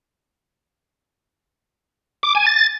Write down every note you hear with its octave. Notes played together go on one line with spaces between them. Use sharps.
D6
G#5
A6